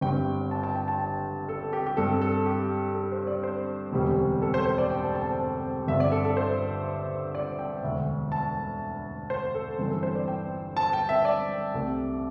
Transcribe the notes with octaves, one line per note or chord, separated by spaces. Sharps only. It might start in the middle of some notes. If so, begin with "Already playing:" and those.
G1 G2 G3 C4 G5
A5
A5
G5
A5
G5
A4
G4
G4
G2 G3 C4 A4
A4
G4
A4
C5
D5
C5
E1 D2 C3 G3
A4
C5
C5
D5
G5
A5
A5
A5
G1 G2 D3 C4 E5
D5
A4
A4
C5
D5
G5
E1 D2 D3 E5
A5
C5
A4
G1 G2 E3 C4 A4
A4
C5
D5
G5
A5
G5
E5
D5
C2 C3 A3 C4